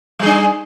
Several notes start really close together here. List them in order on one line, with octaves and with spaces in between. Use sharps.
G3 G#4 D4